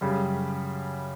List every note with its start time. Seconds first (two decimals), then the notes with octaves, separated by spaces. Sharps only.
0.01 F#2 C#3 G3